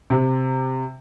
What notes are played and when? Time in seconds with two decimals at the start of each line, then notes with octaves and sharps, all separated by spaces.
0.10 C3